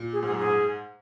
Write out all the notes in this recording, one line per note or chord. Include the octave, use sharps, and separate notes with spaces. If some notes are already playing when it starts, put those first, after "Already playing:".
Already playing: A#2
G#4
G#2
G#4
F#2
G#2 G#4